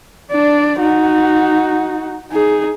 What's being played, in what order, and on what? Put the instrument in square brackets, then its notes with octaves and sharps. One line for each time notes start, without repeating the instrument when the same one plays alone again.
[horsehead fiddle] D4 D5
D#4 F#4
D#4 G#4